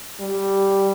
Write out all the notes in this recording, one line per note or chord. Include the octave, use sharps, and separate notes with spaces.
G3